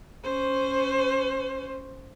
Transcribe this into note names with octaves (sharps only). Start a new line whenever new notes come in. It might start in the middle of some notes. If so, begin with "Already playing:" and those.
C#4 C5